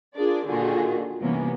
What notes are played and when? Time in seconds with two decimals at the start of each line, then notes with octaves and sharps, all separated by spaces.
0.15 D4 F4 G#4 A#4 D5
0.48 A#2 D3 D#3 F4 F#4 G#4
1.20 G2 C3 E3 A#3 B3 C#4